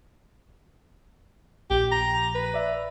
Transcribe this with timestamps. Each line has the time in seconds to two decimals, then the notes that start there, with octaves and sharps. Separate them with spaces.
1.70 A#1 G4
1.92 A#5
2.35 B4
2.54 D5 E5